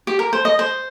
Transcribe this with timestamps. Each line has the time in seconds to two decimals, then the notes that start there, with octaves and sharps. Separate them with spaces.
0.07 G4
0.19 A#4
0.33 C5
0.45 D#5
0.59 C5